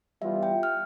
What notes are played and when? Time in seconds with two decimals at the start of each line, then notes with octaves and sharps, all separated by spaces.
0.22 E3 G3 B3 F4 E5
0.43 G5
0.63 F6